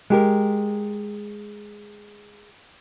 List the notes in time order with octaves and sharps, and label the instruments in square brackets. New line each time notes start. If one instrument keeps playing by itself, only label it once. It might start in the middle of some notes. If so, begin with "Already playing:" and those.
[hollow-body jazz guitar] G#3 G4 A#4